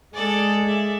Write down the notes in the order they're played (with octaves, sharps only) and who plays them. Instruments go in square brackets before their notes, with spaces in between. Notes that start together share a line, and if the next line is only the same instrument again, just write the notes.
[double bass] G#3 [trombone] G#4 [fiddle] A4 D5
[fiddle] D5 E5